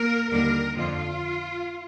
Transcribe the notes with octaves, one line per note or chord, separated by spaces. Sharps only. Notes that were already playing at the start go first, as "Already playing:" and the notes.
Already playing: A#3 A#4
D#2 D3 G3 A#3 A#4
F2 D3 F3 F4